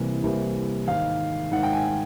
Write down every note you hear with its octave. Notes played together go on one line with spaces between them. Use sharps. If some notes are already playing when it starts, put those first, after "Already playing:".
Already playing: C2 C3 E3 G3 A#3
C2 C3 E3 G3 A#3
G#1 G#2 D#3 F5
G#1 G#2 D#3 F#5
G5
G#5